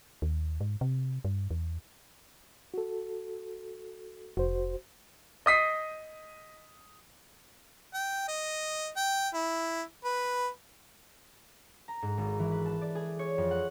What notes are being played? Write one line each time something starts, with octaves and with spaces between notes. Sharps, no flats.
D#2
G#2
C3
G2
E2
F#4 A4
F1 F#4 C5
D#5 D#6 B6 C7
G5
D#5
G5
E4
B4
A#5
G#2
G#1
E3
B4
A5
D5
G#4
C#5
F2
F#5